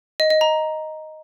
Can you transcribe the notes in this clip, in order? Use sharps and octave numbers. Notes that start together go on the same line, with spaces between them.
D#5
D#5
A#5